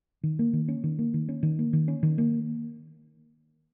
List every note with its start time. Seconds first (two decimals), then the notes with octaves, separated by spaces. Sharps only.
0.23 D#3
0.39 A#3
0.53 D#3
0.68 C#4
0.84 D#3
0.99 A#3
1.14 D#3
1.29 C#4
1.43 D#3
1.59 A#3
1.73 D#3
1.88 C#4
2.03 D#3
2.18 A#3